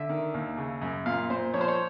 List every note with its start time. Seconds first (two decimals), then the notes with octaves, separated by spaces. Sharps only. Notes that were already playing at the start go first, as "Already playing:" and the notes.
Already playing: D3 E5
0.09 D#3
0.34 D#2
0.57 C#3
0.81 F#2
1.06 A#2 F5
1.30 A#2 C5
1.54 F3 C#5
1.61 C5
1.68 C#5